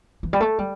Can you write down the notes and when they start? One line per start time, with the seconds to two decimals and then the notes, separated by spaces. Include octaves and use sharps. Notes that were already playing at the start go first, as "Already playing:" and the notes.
0.23 E3
0.33 G3
0.40 A3
0.59 G3